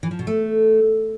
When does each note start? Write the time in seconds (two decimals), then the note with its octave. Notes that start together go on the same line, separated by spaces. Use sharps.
0.03 E3
0.11 F3
0.19 B2
0.27 A3